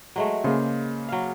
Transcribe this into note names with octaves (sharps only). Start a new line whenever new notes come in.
F#3 G#3 A3
C#3 A#3 G#4 C5
F#3 F5